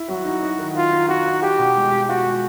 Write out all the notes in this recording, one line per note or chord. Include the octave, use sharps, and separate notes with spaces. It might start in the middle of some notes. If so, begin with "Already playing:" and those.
Already playing: E4
F#3 F#4
D#4
D#4
D#3
D#3 F4
D#4
D#4 F#4
D#4
F4 G4
B2
G#3
G#3
F4 F#4
G#3